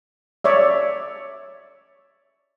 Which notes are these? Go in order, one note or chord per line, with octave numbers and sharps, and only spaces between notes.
C#5 D5 E5